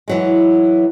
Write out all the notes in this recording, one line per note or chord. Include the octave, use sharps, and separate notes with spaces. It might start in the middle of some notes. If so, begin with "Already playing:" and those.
E3 F#3 G#3